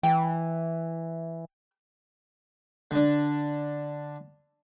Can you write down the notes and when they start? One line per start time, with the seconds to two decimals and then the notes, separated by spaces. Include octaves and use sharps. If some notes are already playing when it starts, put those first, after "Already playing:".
0.03 E3 G5
2.91 D3 D4